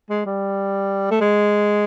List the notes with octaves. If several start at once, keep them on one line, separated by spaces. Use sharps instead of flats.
G#3
G3
A3
G#3